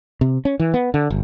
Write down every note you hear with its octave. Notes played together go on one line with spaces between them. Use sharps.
C3
C#4
E3
B3
D3
G1